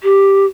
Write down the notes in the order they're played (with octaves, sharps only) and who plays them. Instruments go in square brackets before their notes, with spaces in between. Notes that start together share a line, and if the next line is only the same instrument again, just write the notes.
[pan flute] G4